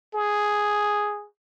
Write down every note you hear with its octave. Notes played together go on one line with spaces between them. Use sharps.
G#4